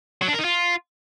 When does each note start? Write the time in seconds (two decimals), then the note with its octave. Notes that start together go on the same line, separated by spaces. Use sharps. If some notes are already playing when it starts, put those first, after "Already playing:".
0.22 F#3
0.28 D4
0.33 A#4
0.39 D#4
0.44 F4